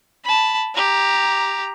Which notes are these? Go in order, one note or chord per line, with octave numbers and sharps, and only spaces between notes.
A5 B5
G4 A#5